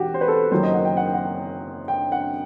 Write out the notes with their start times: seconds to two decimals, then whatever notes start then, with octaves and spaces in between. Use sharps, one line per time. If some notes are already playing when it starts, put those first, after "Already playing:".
Already playing: E1 F#4 G4
0.14 C5
0.21 B4
0.28 A4
0.51 F#1 F#2 D#3 F#3 C5
0.63 D#5
0.74 F#5
0.85 G5
0.97 F#5
1.06 G5
1.14 F#5
1.88 G5
2.12 F#5